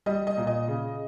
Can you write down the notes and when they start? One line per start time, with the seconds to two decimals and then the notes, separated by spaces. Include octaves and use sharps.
0.06 G3 D#5
0.27 D#5
0.37 A#2
0.47 D#5
0.68 C#3